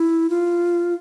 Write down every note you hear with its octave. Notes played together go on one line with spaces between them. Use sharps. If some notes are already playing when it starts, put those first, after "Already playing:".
Already playing: E4
F4